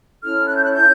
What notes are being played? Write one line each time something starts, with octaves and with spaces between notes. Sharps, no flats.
C#4 E4 A4 C#5 F6
F#6
G6
F#6
G6